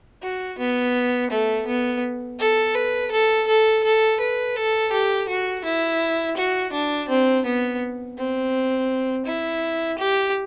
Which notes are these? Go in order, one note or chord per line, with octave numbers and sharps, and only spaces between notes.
F#4
B3
A3
B3
A4
B4
A4
A4
A4
B4
A4
G4
F#4
E4
F#4
D4
C4
B3
C4
E4
G4